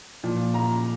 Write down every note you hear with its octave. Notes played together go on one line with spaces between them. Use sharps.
A#2 F3
A#5